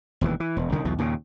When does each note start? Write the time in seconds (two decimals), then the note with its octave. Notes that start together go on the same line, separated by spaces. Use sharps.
0.21 E1 D#2 D3 E3
0.40 E3
0.57 E1
0.72 C2 D3 D#3
0.85 B1 E2 B2
0.98 D#2 A#2 C#3